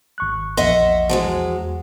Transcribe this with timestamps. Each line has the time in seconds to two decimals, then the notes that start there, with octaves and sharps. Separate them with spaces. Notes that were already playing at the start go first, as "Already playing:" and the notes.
0.18 G#1 C#6 F#6
0.57 A#1 E2 D#5 E5 F#5 C6
1.09 E2 F3 F#3 G#3 F#5